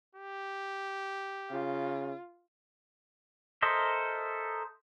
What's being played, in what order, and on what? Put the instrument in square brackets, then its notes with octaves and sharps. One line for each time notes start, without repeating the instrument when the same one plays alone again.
[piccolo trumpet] G4
[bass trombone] C#3 [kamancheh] F4
[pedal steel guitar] A4 A#4 C5 D#5 E5